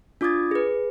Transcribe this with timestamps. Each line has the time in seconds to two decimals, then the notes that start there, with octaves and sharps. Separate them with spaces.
0.21 D4 F4 D6 D#6 G#6 A6
0.51 G#4 B4